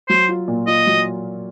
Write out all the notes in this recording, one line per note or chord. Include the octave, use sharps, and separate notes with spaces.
F#3 C5
F4
A#2
F4 D#5
F#3